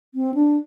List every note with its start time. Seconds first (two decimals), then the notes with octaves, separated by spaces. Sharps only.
0.15 C4
0.34 D4